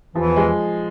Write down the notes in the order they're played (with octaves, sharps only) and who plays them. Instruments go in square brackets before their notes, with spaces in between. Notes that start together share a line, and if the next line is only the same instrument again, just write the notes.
[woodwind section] E2 E3 [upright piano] F3
[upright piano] G#3